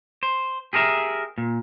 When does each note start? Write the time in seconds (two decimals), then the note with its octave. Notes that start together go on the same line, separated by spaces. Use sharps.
0.23 C5
0.73 G4 G#4 A#4 B4 E5
1.38 A#2